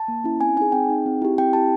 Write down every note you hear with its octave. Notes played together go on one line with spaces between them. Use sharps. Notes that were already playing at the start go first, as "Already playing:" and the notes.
Already playing: A5
A#3
C#4 E4
C4 G#5
D#4 G#4 G#5
C4 G5
D#4 G#4
C4
E4 G4
C4 G5
E4 G4 A5